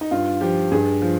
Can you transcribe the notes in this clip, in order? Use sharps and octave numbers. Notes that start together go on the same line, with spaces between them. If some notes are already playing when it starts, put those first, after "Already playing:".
D#4
G2 F4
F3 G4
G2 G#4
F3